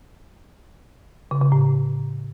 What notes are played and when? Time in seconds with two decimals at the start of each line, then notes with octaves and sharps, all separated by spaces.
1.31 C#3
1.42 C#3
1.52 A2